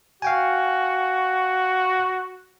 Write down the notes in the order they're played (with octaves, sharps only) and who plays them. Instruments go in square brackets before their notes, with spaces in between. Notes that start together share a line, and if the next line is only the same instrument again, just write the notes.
[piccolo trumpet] F#4 [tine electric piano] F5 G5 G#5